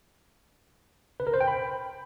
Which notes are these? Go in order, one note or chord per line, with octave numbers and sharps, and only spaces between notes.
B4
A#4
C5
G5
B5